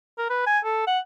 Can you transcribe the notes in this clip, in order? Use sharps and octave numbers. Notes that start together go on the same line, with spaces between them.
A#4
B4
G#5
A4
F#5